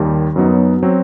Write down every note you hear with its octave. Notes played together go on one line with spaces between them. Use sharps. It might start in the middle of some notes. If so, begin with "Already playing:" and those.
Already playing: D#2 D#3 G3
F#2 F#3 B3 D#4
F#3 C4